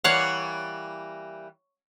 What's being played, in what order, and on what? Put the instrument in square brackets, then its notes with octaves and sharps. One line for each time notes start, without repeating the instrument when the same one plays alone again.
[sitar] E3 G3 A#3 [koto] C#5 F5 F#5